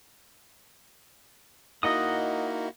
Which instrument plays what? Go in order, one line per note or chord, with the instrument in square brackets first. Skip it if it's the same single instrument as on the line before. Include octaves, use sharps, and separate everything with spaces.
[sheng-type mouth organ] A#3 [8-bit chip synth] D#4 E4 F#4 [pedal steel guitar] D#5 F#5 D#6